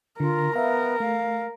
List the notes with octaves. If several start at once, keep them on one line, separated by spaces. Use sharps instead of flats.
D3 F4 A#4
B3 E5 F5 A#5
A3 F5